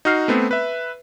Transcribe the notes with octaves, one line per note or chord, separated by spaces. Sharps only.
D#4 F#4 F6 C7
A3 B3 C4
B4 E5